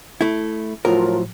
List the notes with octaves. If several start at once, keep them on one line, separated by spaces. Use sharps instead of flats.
A3 E4
A2 F3 F#3 F4 A#4